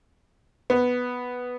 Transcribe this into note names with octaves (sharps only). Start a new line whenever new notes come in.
B3